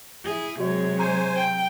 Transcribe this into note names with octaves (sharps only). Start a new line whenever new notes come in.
E4 G#4
C3 F#3 G#3 F#4 C#5 D#5
C5 G#5 A#5
G5